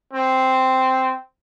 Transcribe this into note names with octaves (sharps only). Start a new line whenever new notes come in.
C4